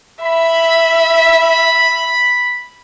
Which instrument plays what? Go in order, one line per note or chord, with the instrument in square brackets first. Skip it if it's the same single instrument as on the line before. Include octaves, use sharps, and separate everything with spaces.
[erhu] E5 [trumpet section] B5